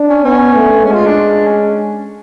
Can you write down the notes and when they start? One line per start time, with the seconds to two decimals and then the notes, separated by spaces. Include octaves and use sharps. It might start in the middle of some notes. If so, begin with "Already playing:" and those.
Already playing: D4
0.09 C#4
0.24 B3 C#4
0.55 A3
0.85 G#3 C#4
0.91 F#4
0.95 F4
1.06 D4
1.47 C#4